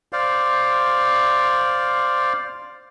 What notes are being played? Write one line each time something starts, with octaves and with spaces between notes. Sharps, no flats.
C5 D5 F5